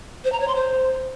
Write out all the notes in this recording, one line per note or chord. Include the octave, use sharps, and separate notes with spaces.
C5
A#5
C#5
C6
C5